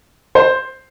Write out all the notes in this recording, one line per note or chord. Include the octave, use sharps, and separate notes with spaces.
C5